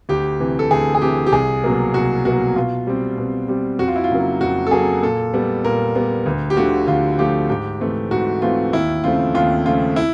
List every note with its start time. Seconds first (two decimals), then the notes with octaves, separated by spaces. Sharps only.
0.09 D2 G4
0.40 C3 E3
0.59 A4
0.71 D2 G#4
0.95 G#4
1.02 C3 E3 G4
1.27 G4
1.32 C2 G#4
1.64 B2 F#3 A#3
1.94 C2 F#4
2.25 B2 F#3 A#3 F#4
2.56 B2 F4
2.87 G3 C4
3.18 B2
3.48 G3 C4
3.79 F2 F#4
3.88 F4
3.96 E4
4.04 F4
4.11 C#3 F#3 A#3
4.41 F2 F#4
4.67 A4
4.71 C#3 F#3 A#3 G#4
5.02 A#2 A4
5.34 G3 B3
5.64 A#2 A#4
5.96 G3 B3
6.26 D2
6.50 G4
6.57 D3 F3 A3 F#4
6.88 D2 F4
7.19 D3 F3 A3 G4
7.49 G#2 G4
7.80 E3 A3 C4
8.11 G#2 F#4
8.42 E3 A3 C4 F4
8.73 D#2 E4
9.04 C#3 F3 A3 C4 F4
9.35 D#2 F4
9.65 C#3 F3 A3 C4 F4
9.96 E4